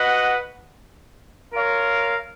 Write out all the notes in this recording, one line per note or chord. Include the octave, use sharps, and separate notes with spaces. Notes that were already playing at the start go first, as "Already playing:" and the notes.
Already playing: F#4 B4 D#5 F#5
F4 A#4 C#5 F5